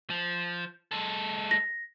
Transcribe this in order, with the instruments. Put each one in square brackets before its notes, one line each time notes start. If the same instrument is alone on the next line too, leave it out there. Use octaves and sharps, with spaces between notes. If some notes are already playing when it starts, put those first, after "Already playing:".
[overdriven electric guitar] F3
G#3 A4
[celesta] A#6